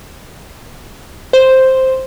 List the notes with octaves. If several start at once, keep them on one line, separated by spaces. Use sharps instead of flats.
C5